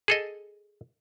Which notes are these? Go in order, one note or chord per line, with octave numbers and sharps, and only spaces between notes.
G#4 A4 D#5